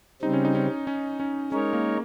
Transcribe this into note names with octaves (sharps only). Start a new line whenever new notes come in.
C#3 G3 C4 D#4
C#4
D#4
C#4
C#4
C#4
G#3 C#4 D#4 A#4 C#5
A#3